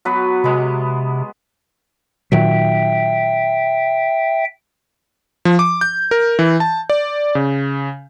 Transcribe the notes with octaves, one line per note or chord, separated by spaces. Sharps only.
F#3 B3 B4
C3 G#3 B3
A#2 D#3 F#3 E5 G5
F3
D6
G6
A#4
E3
A5
D5
C#3